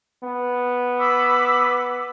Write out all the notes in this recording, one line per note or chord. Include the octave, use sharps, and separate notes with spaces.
B3
B5 D6 E6